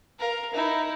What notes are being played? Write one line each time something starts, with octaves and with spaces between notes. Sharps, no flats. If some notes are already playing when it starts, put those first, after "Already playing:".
A#4 F5
D#4 E4